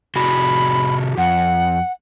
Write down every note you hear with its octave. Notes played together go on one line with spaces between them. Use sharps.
C3 F#4 G#4 B5
F2 F#5